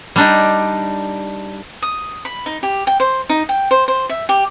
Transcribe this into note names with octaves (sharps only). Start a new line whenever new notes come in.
G3 D4 D#4
D#6
B5
D#4
G4
G5
C5
D#4
G5
C5
C5
E5
G4